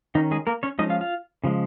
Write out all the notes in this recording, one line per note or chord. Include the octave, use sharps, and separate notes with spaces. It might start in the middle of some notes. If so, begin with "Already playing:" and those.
D#3 C#4 D#4
G#3 G#4
A#3 A#4
C#4 C#5
F3 G#3 C#4 D#4 D#5
F4 F5
F4 F5
C#3 F3 G#3